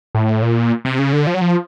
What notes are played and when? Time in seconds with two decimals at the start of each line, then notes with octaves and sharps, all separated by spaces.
0.15 A2
0.42 A#2
0.85 C3
0.99 C#3
1.13 D3
1.27 F3
1.34 F#3
1.42 F3